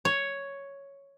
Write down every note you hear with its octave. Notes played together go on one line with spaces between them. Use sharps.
C#5